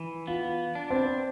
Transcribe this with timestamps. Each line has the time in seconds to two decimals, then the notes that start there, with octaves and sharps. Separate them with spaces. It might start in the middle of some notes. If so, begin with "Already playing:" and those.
Already playing: E3
0.27 B3 F4
0.75 D4
0.90 C4